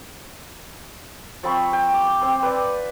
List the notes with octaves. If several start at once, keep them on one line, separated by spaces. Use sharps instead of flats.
F3 C4 B5 C#6
G5
D6
C4 C6
B4 D5